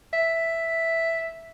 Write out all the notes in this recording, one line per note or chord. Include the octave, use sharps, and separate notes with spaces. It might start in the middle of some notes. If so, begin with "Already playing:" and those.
E5